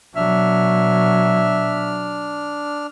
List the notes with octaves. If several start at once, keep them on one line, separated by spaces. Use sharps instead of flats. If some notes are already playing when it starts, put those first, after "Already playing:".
B2 F#3 D4 E5 F6